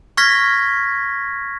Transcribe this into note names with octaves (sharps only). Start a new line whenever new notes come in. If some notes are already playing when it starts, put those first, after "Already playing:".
C#6 F6 G#6 A#6 B6